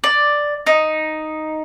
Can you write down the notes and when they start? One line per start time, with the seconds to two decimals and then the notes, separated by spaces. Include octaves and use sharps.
0.04 D5
0.67 D#4